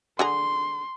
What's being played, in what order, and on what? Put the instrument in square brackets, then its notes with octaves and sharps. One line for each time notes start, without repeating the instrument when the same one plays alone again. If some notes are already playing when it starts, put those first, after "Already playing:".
[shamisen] D3 G#4 A#5 [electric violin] C6